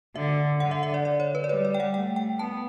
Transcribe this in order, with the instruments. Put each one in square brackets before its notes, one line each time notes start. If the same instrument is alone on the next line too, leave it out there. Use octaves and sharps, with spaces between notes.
[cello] D3 [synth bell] E5
[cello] D3 [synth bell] F#5
[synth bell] E5
E5
D5
D5
C#5
B4
D5
[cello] G3 [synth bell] C#5
[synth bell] D5
G5
F#5
[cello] A3 [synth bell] G5
[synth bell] G5
[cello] B3 [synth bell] A5